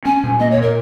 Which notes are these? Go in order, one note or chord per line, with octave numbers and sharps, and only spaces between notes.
C#4 G#5
A#2
A#3 D#5
C#5
A#2 A#4